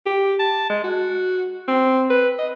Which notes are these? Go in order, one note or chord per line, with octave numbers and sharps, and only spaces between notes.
G4
A5
G#3
F#4
C4
B4
D#5